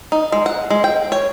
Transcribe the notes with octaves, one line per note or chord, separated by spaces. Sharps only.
D#4
G#3
F#5
G#3
G5
C#5